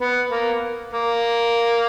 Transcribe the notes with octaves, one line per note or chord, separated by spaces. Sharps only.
B3
A#3
A#3